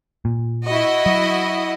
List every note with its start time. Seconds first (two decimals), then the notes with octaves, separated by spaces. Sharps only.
0.25 A#2
0.66 E4 F#4 D#5
1.06 F#3